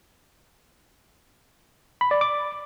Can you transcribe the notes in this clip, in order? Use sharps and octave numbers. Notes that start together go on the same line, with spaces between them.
B5
D5
D6